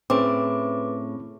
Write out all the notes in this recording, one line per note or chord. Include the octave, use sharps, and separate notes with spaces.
A2 C4 C#4 G#4 B4 D6